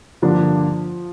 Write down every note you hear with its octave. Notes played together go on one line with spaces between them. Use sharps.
G2 D3 F3 A#3 D4